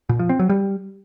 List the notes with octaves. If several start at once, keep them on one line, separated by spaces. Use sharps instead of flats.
A#2
F3
C4
F#3
G3